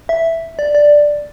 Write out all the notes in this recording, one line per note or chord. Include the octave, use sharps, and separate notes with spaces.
E5
D5
D5